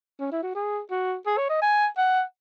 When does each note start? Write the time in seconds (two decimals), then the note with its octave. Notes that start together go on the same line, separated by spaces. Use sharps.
0.19 C#4
0.32 E4
0.43 F#4
0.55 G#4
0.91 F#4
1.26 G#4
1.37 C#5
1.49 D#5
1.62 G#5
1.97 F#5